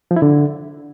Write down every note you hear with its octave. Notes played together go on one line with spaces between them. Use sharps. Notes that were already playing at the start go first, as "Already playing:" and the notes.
F3
E4
D3